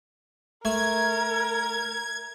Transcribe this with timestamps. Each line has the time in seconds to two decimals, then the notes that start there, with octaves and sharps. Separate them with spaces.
0.65 A3 A#4 G#6